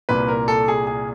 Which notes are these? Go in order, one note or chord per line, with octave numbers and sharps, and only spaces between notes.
C2 A#2 B4
A#4
A4
G#4
G#4